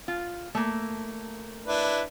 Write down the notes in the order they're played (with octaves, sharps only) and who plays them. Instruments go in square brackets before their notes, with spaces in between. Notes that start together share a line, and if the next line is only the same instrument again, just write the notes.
[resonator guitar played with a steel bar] F4
A3 A#3
[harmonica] D4 E4 B4